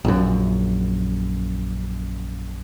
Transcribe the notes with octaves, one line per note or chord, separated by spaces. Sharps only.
A#1 F#2